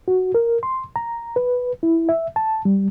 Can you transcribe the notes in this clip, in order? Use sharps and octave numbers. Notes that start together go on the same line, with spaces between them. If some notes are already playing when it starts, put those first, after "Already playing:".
F#4
A#4
C6
A#5
B4
E4
E5
A5
G3